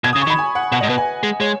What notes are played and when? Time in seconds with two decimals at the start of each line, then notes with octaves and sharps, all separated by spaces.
0.04 B2 G#6
0.13 D#6
0.16 C#3
0.22 C#6
0.27 D#3
0.30 B5
0.39 G#5
0.55 F#5
0.72 B2 F#5
0.81 G#2 D#5
0.89 B2 B4
0.98 G#5
1.23 G#3
1.40 G#3 C#5